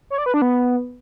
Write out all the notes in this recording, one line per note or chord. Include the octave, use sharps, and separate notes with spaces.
C#5
D5
B4
D4
B3